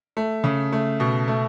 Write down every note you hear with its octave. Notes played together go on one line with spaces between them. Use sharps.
A3
C#3
A3
B2
A3